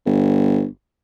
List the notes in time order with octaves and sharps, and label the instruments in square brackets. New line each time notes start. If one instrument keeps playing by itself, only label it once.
[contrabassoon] G1